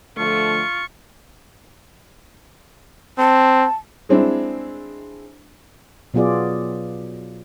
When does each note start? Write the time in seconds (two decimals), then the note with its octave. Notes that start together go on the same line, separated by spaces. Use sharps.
0.18 D3 F3 A3 F4 C#6
3.18 C4 A5
4.09 G#3 C4 D4 E4
6.14 B2 F#3 B3 F4 G#4 D5